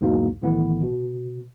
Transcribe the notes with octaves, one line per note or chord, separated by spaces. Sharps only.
B1 E2 G#2 B2 A#3
B1 A2 D#3 E3 B3
B2